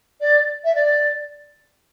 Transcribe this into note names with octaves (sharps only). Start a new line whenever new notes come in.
D5
E5
D5